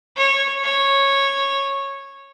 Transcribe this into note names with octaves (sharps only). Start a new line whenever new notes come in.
C#5
C#5